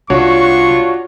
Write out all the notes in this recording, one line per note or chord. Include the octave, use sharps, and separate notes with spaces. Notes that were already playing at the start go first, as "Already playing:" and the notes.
C2 D4 F4 F#4 C#5 C#6